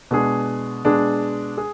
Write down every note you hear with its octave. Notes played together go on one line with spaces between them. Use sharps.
B2 G#3 D4 G#4
B2 G#3 D4 G#4
G#4